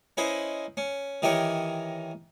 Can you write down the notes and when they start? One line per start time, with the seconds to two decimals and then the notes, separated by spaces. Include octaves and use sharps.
0.17 C#4 D#4 E4 B4 C5 D#5
0.77 C#4
1.22 D#3 E3 D#4 G4 A#4 C#5